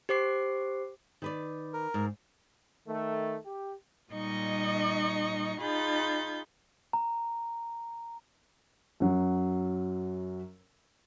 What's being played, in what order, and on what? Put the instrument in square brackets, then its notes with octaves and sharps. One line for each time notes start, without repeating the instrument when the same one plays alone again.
[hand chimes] G4 C5 D6 C7
[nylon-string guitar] D#3 B4 D5
[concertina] A#4
[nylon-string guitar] G#2
[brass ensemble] D#3 A3
G4
[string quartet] A#2 G3 D#4 D#5 C#6
D#4 F4 G#4 B5 G6 A6
[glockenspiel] A#5
[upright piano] F#2 F#3